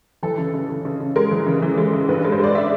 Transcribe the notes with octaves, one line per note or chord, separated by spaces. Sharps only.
E3 A4
C#3
C#3
C#3
C#3
C#3
G#3 A#4
E3
C#3
E3
G#3
C#3
G2 B4
G#3
C5
G#3 D5
G#3 E5